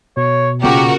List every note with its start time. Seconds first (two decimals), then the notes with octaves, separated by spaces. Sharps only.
0.17 B2 C#5
0.62 A#2 C#3 F#4 G4 A#4